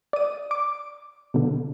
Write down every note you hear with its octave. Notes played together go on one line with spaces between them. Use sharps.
D5 D#6
D6
B2 D3